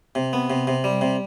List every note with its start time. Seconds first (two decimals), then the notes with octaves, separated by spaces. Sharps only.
0.15 C3
0.33 B3
0.50 C3
0.67 C3
0.84 G3
1.01 C3